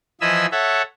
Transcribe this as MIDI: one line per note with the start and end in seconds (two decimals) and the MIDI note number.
0.21 0.46 52
0.21 0.46 53
0.21 0.46 75
0.21 0.46 80
0.21 0.46 83
0.21 0.46 88
0.52 0.82 69
0.52 0.82 73
0.52 0.82 76
0.52 0.82 78